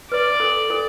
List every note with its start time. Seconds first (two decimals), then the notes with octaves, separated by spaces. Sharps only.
0.11 B4 D5
0.40 A4
0.70 A4